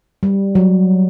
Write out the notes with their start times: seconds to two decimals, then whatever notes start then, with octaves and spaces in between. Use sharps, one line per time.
0.23 G3
0.55 F#3